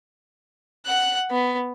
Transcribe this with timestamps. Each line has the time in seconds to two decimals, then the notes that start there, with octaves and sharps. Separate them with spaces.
0.86 F#5 F#6
1.31 B3